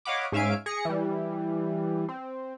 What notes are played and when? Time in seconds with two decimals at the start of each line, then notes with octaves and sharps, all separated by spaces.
0.05 C#5 D#5 F5 F#5 B5 D6
0.32 G#2 C#4 E5 F5 G#5 D7
0.66 G#4 A#6 C#7
0.85 E3 G3
2.09 C4